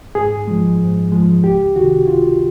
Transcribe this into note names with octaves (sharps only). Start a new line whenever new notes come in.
G#2 G#4
F3 G#3
G#2
F3 G#3
C#2 G4
C3 D#3 F#4
C#2 F4